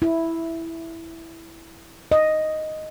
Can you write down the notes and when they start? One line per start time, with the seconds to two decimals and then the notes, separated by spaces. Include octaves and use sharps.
0.02 E4
2.12 D#5